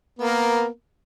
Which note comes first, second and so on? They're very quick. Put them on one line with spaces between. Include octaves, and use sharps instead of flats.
B3 A#3 A#4